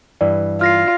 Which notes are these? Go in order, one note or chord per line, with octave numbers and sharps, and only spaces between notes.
G2 E3 D5
F4 F6 A#6 C7